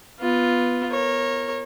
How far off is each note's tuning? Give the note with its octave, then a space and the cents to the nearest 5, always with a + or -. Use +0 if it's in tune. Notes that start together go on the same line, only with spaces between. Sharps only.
B3 +0 F4 +0
A#4 +0 C#5 -25